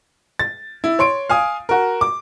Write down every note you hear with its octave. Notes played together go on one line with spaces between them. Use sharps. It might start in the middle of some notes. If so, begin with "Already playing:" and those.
A6
E4
C#5 C6 D7
F5 G#5 D#6
F#4 A#4
D6